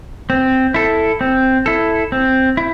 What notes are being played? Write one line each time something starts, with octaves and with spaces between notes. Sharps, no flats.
C4
E4 A4
C4
E4 A4
C4
E4